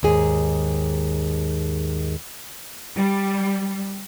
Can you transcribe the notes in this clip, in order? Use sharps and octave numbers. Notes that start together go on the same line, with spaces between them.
D#2 G#2 G#4
G3